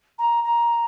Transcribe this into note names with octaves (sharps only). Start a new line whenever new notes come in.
A#5
A#5